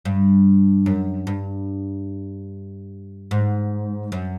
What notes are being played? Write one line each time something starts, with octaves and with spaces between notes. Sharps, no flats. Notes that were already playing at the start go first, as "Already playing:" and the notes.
G2
F#2
G2
G#2
F#2